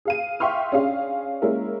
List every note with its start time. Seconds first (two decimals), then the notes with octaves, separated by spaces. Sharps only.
0.05 G#4 F5 D#7
0.40 E5 F5 G5 C6 C#6 F6
0.72 C#4 D4 G#4 F5
1.42 G#3 A#3 C#4 E4 A#4